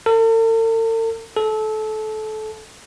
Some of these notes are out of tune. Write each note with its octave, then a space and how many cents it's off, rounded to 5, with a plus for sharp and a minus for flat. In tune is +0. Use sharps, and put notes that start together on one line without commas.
A4 +45
A4 -25